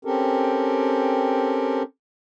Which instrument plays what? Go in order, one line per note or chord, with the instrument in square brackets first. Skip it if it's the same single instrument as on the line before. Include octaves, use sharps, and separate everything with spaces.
[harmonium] C4 C#4 G4 A4 A#4